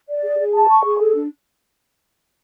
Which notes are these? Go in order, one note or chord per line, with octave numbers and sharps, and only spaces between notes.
D5
G#4
G#4
A5
C#6
G#4
A4
D4